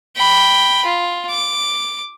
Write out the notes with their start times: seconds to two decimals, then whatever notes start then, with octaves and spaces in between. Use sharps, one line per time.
0.17 G5 B5
0.85 F4
1.30 D6